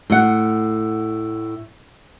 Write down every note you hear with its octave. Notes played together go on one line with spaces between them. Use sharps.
A2 F#5